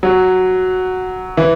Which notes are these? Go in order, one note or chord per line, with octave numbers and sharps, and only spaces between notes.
F#3
E3